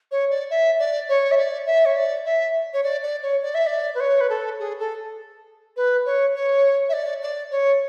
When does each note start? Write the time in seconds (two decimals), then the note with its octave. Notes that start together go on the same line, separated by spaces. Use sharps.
0.11 C#5
0.30 D5
0.50 E5
0.79 D5
1.09 C#5
1.31 E5
1.37 D5
1.66 E5
1.85 C#5
1.96 D5
2.25 E5
2.73 C#5
2.83 D5
3.02 D5
3.22 C#5
3.42 D5
3.54 E5
3.66 D5
3.94 B4
4.00 C#5
4.20 B4
4.29 A4
4.59 G#4
4.79 A4
5.76 B4
6.05 C#5
6.35 C#5
6.89 E5
6.93 D5
7.22 D5
7.51 C#5